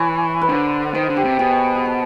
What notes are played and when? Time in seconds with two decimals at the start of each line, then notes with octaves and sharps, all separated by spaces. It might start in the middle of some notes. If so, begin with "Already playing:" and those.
Already playing: E3 C#5
0.42 B4
0.49 D3 C5
0.94 D#3 C5
1.09 D3
1.17 G4
1.25 C3
1.39 B2 G#4
1.75 G#4
1.85 A4